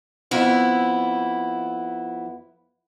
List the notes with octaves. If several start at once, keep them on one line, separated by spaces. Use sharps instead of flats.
F2 B3 E4